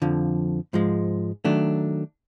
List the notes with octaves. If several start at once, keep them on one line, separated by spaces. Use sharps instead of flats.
F2 D3 F3
G#2 F3 G#3
D#3 F#3 A3 D4